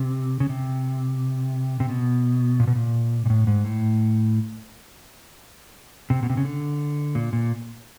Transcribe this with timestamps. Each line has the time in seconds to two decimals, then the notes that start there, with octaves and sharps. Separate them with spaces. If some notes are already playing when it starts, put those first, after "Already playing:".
Already playing: C3
0.40 C#3
0.49 C3
1.80 C3
1.89 B2
2.60 A#2
2.67 B2
2.75 A#2
3.26 A#2
3.30 A2
3.47 G#2
3.65 A2
6.10 C3
6.23 B2
6.30 C3
6.37 C#3
6.45 D3
7.15 A#2
7.33 A#2